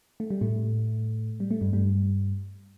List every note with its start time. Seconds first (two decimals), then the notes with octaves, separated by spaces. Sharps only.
0.20 A3
0.30 G3
0.41 A2 A3
1.40 G3
1.51 A3
1.61 G2 G3
1.73 G2 G3